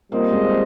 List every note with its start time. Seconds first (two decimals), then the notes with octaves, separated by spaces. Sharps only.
0.12 G3 A#3 C4 F4 C5 D#5
0.33 G#3